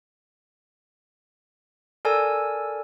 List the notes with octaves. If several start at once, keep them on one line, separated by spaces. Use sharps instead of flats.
A4 A#4 D5 G#5 E6